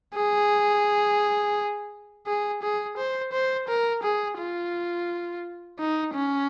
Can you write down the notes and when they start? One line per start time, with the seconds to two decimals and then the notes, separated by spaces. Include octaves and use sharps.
0.15 G#4
2.27 G#4
2.62 G#4
2.97 C5
3.32 C5
3.68 A#4
4.03 G#4
4.38 F4
5.79 D#4
6.14 C#4